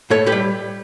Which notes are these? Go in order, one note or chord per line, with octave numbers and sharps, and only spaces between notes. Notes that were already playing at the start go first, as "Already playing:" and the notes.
A2 A4 C#5
G4 B4
G3